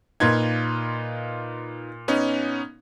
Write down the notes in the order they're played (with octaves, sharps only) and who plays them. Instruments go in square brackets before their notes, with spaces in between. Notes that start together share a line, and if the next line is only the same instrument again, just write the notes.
[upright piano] A#2 G#6 [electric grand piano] D#4 F4 B4
[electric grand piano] B3 C#4 D#4